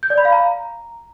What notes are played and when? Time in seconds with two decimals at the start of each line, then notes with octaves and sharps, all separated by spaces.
0.03 G6
0.10 D5
0.18 B5
0.25 F5
0.32 A#5